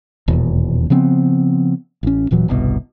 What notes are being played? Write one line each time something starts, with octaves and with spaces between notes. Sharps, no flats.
D#1 E2 B2
C#3 F3 B3 C4
A1 C#4
D#1 A#2 E3 F#3
G1 C2 B2